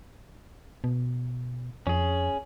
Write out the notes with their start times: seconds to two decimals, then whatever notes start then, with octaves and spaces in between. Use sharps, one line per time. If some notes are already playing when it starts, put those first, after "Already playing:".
0.84 B2
1.87 F2 C#4 G#4